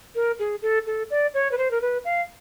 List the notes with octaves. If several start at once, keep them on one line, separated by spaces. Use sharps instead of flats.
A#4
G#4
A4
A4
D5
C#5
B4
C5
A#4
B4
F5